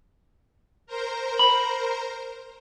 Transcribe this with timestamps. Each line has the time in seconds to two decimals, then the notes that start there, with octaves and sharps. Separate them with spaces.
0.86 A#4 C5 A#5
1.39 B5